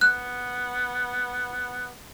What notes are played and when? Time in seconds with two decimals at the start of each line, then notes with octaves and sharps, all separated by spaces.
0.01 B3 F#6